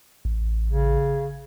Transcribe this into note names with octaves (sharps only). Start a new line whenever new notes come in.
A1
C#3